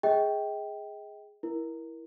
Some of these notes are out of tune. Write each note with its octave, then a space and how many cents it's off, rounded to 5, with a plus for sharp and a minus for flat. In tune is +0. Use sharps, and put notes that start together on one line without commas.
G#4 +0 D#5 +35 G5 +0
E4 +0 A#4 +20